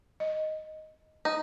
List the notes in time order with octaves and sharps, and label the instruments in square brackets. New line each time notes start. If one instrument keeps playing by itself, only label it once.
[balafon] D#5
[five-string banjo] D#4